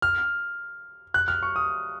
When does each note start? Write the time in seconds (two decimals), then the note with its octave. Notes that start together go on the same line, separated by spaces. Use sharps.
0.02 F6
1.14 F#6
1.28 F6
1.43 C#6
1.56 D#6